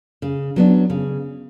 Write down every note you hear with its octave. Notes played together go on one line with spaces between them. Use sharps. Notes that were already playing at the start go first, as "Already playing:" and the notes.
C#3
F#3 B3 D4
C#3